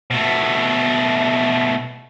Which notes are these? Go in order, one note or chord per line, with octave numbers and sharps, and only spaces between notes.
B2 A3